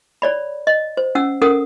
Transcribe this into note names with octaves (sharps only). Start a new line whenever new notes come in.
C#5 D5 B5
D#5
C5
C#4 F#5 E6
C#4 A4 A#4 F#5 D#6